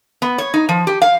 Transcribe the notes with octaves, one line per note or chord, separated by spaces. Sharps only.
B3
C#5
D#4
F3
G4
F5